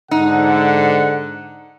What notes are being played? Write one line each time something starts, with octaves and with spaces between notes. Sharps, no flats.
G#2 D3 D#4 F#5